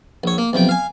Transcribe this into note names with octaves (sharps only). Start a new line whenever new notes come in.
A#1 C#5
A#3
B1 C3 F3 G5
F5 G#5